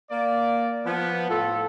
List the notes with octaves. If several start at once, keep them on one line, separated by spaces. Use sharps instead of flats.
A#3 D5
F3 B3
A2 F4 A4